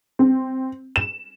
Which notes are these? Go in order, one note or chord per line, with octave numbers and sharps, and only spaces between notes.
C4
E7